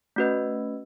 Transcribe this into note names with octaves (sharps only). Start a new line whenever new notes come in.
A3 C#4 F#4 B4 D#5